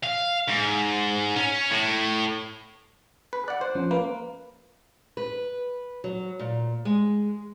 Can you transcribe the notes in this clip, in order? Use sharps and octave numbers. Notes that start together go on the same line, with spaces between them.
F5
G#2
C#4
A2
B4
D5 F#5 F#6
C5
F3 C#4
A#3 B4
B4
F#3
A#2
G#3